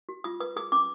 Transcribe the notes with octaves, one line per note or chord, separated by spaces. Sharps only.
F#4
F4 D#6
B4 D#6
G#4 D#6
C#4 D6